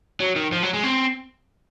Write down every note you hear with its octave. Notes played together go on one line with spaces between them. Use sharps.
F#3
D#3
F3
F#3
G#3
C4